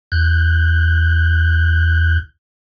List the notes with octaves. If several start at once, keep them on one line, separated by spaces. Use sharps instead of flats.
E2 F#6 G6